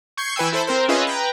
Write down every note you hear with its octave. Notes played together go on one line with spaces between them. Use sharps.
C#6 G6 G#6 C7 C#7
E3 B4 G5 G#5 E6
E4 A4 C5 B5
C4 A#4 C5
C#4 F4 G#4 B4 D#5 E5
B4 G5 A#5